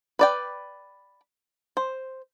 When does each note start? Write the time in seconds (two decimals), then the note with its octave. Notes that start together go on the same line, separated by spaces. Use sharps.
0.19 B4 D5 G5
1.77 C5